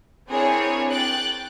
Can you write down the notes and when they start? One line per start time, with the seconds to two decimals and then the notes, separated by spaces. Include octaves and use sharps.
0.28 C4 D4 E4 G#4 A#4 C#5
0.90 G5 F#6 A6